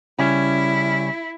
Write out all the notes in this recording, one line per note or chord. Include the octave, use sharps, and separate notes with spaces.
C#3 G3 C#4 E4